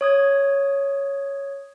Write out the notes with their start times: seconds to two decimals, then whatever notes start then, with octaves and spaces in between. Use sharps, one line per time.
0.01 C#5 D#6 G#6